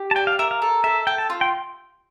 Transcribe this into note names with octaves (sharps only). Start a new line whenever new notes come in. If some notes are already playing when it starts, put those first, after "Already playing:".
Already playing: G4
A5
D5 G5
F5
A#4 E5
F5
A4
A4 E5
A4 G5
A5
F4
G5